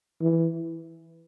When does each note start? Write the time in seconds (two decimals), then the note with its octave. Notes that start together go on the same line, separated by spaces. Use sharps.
0.21 E3